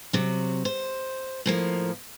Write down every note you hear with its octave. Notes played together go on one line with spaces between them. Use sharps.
C3 F#3
C5
A2 F3 A#3